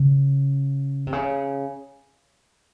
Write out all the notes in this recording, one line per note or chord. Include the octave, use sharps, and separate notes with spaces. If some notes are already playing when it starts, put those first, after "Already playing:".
Already playing: C#3
C3
C#3